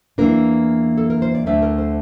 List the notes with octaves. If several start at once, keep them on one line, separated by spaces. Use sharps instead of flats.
E2 E3 A#3 D4 A#4
A4
A#4
C5
D5
D2 D3 A3 D4 E5
A#4
C5